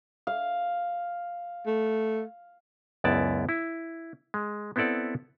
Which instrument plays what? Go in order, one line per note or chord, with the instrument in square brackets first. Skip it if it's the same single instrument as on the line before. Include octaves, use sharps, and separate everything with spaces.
[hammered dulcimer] F5
[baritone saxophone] A3
[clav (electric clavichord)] C#2 F#2 B3 E4 D5 A5
E4
G#3
B3 C4 E4 A4 D5 F#5